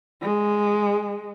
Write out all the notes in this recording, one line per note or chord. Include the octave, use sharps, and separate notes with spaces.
G#3